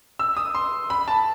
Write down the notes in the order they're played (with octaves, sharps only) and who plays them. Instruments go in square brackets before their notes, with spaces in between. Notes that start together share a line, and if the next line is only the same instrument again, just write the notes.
[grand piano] E6
D#6
C6
B5
A5